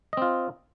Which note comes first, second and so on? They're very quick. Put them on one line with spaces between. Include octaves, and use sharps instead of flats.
D#5 C4 F4